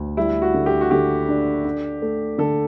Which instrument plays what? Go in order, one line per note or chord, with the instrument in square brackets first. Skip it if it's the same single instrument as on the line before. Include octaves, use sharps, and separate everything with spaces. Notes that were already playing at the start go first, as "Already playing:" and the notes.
Already playing: [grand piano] D2
[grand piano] G3 [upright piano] E4
[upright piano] F#4
[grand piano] D3
[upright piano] G4
F#4
[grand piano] D3 [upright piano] G4
[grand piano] D4
D4
A3
[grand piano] D3 [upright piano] A4